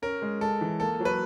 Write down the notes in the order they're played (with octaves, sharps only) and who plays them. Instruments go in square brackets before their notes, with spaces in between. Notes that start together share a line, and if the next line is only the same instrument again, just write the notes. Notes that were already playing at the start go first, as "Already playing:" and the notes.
[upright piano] C#4 [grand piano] A#4
[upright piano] G#3
[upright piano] G#3 [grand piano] A4
[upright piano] E3
[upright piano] A#3 [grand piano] A4
[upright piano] F#3
[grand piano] B4